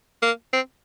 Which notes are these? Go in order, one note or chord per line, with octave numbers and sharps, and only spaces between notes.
A#3
C4